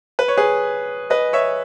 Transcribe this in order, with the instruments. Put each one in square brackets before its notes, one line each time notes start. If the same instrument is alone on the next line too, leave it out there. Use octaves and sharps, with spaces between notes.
[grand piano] B4
C#5
G#4 B4
B4 D#5
C#5 E5